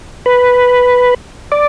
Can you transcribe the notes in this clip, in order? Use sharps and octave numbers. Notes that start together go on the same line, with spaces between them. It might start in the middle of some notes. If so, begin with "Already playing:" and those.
B4
D5